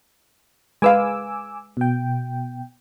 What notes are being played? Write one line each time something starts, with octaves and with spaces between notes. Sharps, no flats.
G#3 B4 F5 G#5 D6 E6
B2 G5